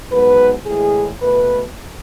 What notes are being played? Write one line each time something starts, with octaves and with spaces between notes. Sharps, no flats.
G#2 F#3 B3 B4
A2 E3 G#3 G#4
B2 A3 B4